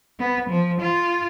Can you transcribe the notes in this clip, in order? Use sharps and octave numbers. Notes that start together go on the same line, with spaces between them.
B3
F3
F4